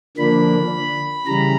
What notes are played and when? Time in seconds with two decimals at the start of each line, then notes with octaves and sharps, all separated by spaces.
0.17 D3 F3 A#3 D4 B5
1.27 C#3 E3 G3 A#5